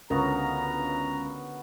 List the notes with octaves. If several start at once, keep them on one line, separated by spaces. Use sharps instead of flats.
C#2 D3 B3 C#4 F#4 A#4 A#5